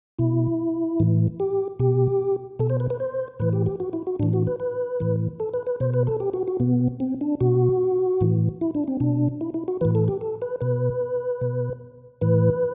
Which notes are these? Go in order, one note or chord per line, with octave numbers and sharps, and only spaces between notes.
B2 E4
A2 E3
G4
B2 G4
B2 A4
C5
B4
B4
C5
A2 E3 B4
G4
G4
F#4
E4
F#4
A2 E3 D4
F#4
B4
B4
A2 E3
A4
B4
B4
B2 C5
B4
A4
G4
F#4
F#4
B2 B3
C4
D4
B2 F#4
A2 E3
E4
D4
C4
B2 D4
E4
E4
F#4
A2 E3 B4
A4
G4
A4
B4
B2 B4
B2
A2 E3 B4